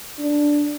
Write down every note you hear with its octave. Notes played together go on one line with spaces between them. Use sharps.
D4